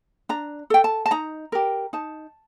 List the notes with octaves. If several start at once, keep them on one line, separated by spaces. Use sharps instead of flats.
D4 A#5
A4 G5
A5
A5
D#4 A#5
G4 A#4
D#4 A5